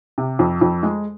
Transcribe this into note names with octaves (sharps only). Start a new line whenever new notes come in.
C3
F2
F2
G#3